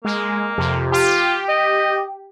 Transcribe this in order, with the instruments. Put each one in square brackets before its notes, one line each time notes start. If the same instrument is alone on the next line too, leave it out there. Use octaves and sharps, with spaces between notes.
[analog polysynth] G#3 [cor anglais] A#3
[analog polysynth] F2 C3
[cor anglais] F4 [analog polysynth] G4
[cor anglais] D#5